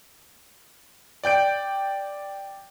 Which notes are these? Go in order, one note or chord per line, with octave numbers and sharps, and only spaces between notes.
D5 G5 G6 D7